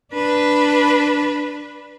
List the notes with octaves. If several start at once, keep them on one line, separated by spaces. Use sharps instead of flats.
D4 B4